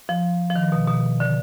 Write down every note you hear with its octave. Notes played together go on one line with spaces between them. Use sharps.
F3
F3
D#3
B2
B2
D3